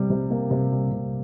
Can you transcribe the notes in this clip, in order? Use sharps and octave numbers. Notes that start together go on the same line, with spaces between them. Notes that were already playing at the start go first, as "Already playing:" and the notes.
Already playing: C3 G3
C3
A#3
C3
G3
C3